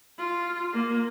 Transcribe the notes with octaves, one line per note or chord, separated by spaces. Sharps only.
F4
A#3